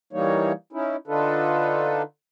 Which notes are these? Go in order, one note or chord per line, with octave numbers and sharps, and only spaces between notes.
E3 G3 A#3 D#4 C#5
C#4 D#4 E4
D3 D4 D#4 F4 A4 B4